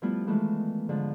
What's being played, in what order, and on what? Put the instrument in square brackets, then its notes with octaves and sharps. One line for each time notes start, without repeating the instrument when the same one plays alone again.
[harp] F3 G3 A3 B3 E4 F4
D#3 E3 G#3 A3 F4
G#2 D3 F3 G#3